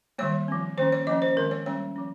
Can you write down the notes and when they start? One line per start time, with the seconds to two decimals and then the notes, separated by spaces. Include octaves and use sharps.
0.18 D#3 G3 A#3 C#5
0.48 F3 C4
0.78 D#3 A#3 C#4 C5
0.92 C#5
1.07 F3 A#3 C#4 D#5
1.22 C5
1.36 D#3 G#3 C4 A#4
1.51 C#5
1.66 G3 A#3 C#4 C#5
1.96 F3 A#3 C#4